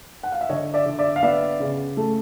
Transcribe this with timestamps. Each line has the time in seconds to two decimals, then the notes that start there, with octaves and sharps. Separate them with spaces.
0.23 F#5
0.32 F5
0.41 E5
0.49 D3 C#5 D#5
0.74 D5 E5
0.86 D3
0.99 D5 E5
1.16 F5
1.23 B3 D5 E5
1.60 C#3
1.97 A3